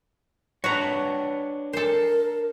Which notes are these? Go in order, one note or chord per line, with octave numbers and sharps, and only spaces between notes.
D4 F#4 B4 C#5 F#5 A#5
A4 A#4 C5